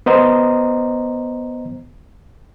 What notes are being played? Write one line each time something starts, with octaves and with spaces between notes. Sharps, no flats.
B3 C5 D#5 A#5